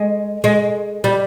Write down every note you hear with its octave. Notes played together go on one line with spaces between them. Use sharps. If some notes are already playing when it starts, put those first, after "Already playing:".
Already playing: G#3
G#3
G3